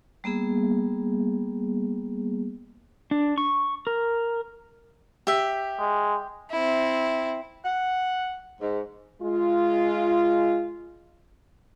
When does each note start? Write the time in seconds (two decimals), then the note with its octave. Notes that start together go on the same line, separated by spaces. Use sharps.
0.24 G3 A#3 B3 G#4
3.11 D4
3.38 C#6
3.87 A#4
5.27 G4 E5
5.79 G#3
6.51 C4 E4
7.65 F#5
8.60 G#2
9.22 G#3 F4